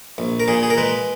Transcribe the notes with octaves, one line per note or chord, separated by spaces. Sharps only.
A#1
A#4
A#2 G#4
G#4
A#4
G#3 B4